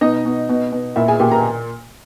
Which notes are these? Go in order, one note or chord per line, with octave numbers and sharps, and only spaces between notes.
B2 D#4 D#5
B2
B2
B2
A#2 E4 E5
G#4 G#5
A#2 G4 G5
A#4 A#5